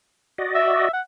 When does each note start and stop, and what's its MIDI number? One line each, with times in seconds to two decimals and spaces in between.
0.38 0.89 66
0.38 0.89 74
0.38 0.89 75
0.55 0.88 76
0.93 1.01 78